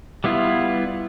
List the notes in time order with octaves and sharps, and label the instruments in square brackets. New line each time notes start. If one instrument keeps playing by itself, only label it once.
[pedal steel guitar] G3 B3 E4 F4